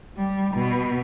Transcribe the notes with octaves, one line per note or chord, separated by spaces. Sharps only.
G3
B2